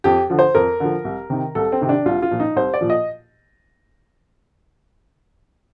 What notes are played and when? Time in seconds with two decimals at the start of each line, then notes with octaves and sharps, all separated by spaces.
0.04 F2 G4
0.30 D3 F3
0.39 C5
0.55 F2 A#4
0.80 D3 F3
1.05 C2
1.30 C3 D#3
1.55 C2 A4
1.72 C4
1.81 C3 D#3
1.89 D4
2.06 C2 F4
2.22 F4
2.31 A#2 F3
2.40 D#4
2.56 C2 C5
2.74 D5
2.81 A#2 F3
2.90 D#5